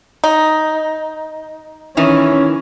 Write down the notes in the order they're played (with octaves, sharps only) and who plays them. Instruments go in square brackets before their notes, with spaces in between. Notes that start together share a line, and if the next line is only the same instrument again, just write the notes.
[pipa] D#4
[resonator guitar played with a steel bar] D#3 E3 [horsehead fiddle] C#4